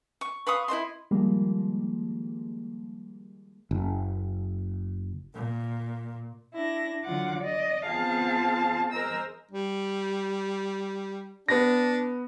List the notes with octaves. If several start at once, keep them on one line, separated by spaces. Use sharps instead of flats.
C#6
B4 F5 C#6 D#6
E4 C5 D#5 C6
D#3 F3 G3 G#3 A#3
F#1
A#2
D4 E4 A#6
D3 F#3 F4 F#5 D6
D5 D#5
B3 C4 F4 G#4 F5 A5
G#4 A#4 C5 D#5 A#5 E6
G3
B3 D4 A#6